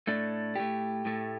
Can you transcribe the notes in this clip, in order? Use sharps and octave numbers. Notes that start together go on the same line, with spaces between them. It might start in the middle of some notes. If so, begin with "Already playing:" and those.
A2 A3 D4
A2 A3 G4
A2 A3